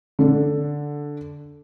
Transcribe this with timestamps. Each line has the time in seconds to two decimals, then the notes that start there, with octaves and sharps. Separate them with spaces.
0.19 D3 D4